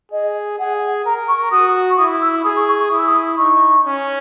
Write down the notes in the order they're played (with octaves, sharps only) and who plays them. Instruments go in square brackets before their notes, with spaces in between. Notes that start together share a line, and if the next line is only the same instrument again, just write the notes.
[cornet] G#4 [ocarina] D#5
[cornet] G#4 [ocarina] F#5
[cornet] A#4 [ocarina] A#5
[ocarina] C#6
[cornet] F#4 [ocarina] D#6
[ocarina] C#6
[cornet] E4 [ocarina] D#6
[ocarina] E6
[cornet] G#4 [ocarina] D#6
[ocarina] C#6
C#6
C#6
[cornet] E4 [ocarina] D#6
[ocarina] E6
D#6
[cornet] D#4 [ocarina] C#6
[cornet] C#4